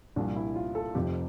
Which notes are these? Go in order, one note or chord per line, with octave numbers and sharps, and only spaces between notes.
C2 A#2 F3 D4
E4
F4
A4
F1 F2 C3 F3 G4